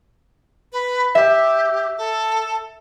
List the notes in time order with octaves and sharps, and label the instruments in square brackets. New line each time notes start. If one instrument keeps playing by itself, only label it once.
[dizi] B4
[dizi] G4 [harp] E5
[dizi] A4